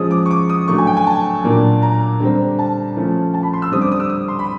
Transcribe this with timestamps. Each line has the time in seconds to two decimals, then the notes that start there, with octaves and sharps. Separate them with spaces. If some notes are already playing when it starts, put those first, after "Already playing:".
Already playing: F3 G#3 C#4 D#6
0.11 D6
0.26 C#6
0.31 D6
0.49 D#6
0.68 D3 F#3 A3 C#6
0.78 G#5
0.87 G5
0.97 G#5
1.07 A5
1.44 A#2 F#3 A#3 D4
1.82 A#5
2.20 D3 G3 C4
2.59 A5
2.96 F3 A3 C#4
3.34 A5
3.43 B5
3.53 C6
3.62 E6
3.71 D3 G3 C4 D#6
3.81 D6
3.92 D#6
4.00 E6
4.09 D#6
4.28 C6
4.39 B5